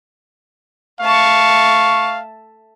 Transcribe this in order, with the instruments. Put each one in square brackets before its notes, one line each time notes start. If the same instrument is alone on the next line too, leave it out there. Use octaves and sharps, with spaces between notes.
[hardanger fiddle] A3 A5 [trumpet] F5 [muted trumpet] C#6